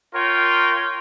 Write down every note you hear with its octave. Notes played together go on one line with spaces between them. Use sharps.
F4 A#4 C#5 G5